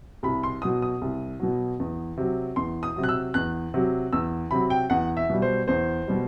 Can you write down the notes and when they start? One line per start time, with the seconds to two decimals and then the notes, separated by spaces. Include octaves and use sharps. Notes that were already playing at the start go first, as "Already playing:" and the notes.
0.23 C2 B5
0.43 C6
0.62 B2 F#3 D#6
0.82 D#6
1.02 C2
1.40 B2 F#3
1.80 E2
2.17 C3 F#3
2.56 E2 C6
2.83 D#6
2.96 C3 F#3
3.03 F#6
3.09 E6
3.34 E2 F#6
3.74 C3 F#3
4.13 E2 E6
4.51 C3 F#3 B5
4.70 G5
4.90 E2 F#5
5.17 E5
5.30 B2 G3
5.42 C5
5.68 E2 C5
6.07 B2 G3